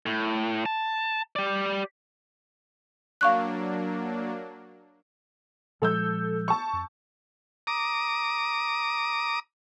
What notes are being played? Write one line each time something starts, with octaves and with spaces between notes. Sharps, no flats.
A2
A5
G4 D5
F#3 A#3 D4 F5 C#6 F#6
A#2 F3 G#3 A4 E6 G6
A5 C#6
F2
A#5 D6 D#6